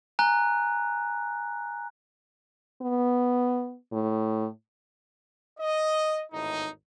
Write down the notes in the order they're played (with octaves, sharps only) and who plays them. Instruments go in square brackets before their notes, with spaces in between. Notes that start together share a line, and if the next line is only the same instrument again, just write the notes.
[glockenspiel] G#5 A#5 F#6
[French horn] B3
A2
[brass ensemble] D#5
G#1 E2 A2 D#4